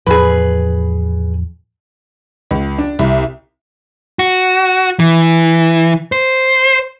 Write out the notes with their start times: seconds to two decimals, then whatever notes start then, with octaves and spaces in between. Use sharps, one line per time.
0.07 E2 A2 F3 G#4 B4
2.51 C#2
2.78 D4
2.99 C2
4.19 F#4
4.99 E3
6.12 C5